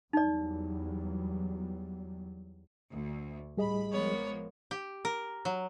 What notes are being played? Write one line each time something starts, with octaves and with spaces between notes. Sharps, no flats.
E2 F#3 G3 D#4 D5
D2
A1 A2 G3 G#4 D#5 B5
F3 G#3 A#3 B3 C#5
G4
A#4
F#3